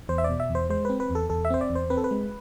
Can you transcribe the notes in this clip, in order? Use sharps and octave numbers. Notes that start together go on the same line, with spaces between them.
E2 C5
E5
D5
B2
E5
E2
C5
G#3 C5
C4 B4
B4
E2
A4
E2 A4
E5
C4 C5
D5
E2
C5
C4 B4
A4
B4
G#3